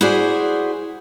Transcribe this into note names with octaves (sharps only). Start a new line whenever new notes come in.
E4 F#4 G#4 C5 D5